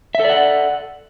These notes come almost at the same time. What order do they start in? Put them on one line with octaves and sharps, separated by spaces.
E5 A4 D5 F#5